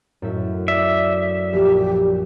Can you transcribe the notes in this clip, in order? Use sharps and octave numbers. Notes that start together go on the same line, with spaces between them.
F#2 A2 E5
D5 E5 D6 D#6
A#1 G4